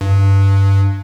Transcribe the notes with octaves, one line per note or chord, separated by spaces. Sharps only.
G2